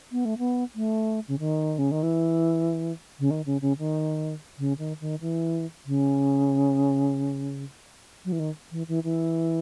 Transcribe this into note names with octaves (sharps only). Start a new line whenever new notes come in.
B3
A3
B3
A3
C#3
D#3
C#3
D#3
E3
C#3
D#3
C#3
C#3
D#3
C#3
D#3
D#3
E3
C#3
F#3
E3
D#3
E3
E3
E3